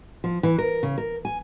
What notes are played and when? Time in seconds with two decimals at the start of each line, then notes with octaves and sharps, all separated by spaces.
0.24 F3
0.43 E3
0.58 A#4
0.83 C#3
0.98 A#4
1.25 G#5